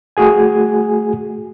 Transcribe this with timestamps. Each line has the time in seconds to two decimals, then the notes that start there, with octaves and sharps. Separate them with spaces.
0.17 A3 F#4 G#4 G#5